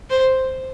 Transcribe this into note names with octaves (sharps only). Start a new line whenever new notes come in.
C5